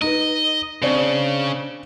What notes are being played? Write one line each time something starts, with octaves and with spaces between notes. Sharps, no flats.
D#4 B4 D#5
C#3 C4 D4 D5